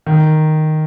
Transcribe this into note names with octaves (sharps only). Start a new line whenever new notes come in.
D#3